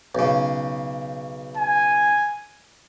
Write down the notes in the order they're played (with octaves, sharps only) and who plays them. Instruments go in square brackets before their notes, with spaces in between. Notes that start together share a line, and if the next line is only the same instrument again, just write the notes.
[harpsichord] B1 C#3
[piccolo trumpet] G#5